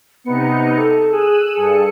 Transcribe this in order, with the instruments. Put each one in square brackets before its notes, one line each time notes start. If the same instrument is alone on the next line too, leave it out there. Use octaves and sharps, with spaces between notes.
[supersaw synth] C3 D#4 C#7 [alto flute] B3
[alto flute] A4
[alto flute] G#4 [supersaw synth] E6 F#6 D#7
[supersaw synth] G2 A4 C#7 [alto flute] G#4